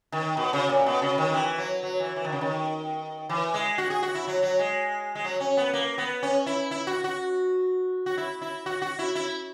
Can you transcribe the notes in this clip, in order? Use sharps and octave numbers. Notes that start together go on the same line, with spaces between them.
D#3
B2
C#3
A#2
B2
C#3
D#3
E3
F#3
F#3
E3
E3
D#3
C#3
D#3
E3
G#3
F#4
G#4
F#4
E4
F#3
F#3
G#3
G#3
F#3
C#4
B3
A#3
B3
C#4
E4
E4
F#4
F#4
F#4
E4
E4
F#4
F#4
E4
E4